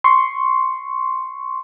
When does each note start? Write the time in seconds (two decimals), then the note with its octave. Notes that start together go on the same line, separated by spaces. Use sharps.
0.04 C6 C#6